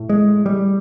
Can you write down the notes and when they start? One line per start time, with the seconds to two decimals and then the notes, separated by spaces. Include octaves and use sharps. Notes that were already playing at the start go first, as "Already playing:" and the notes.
Already playing: A2
0.09 G#3
0.46 G3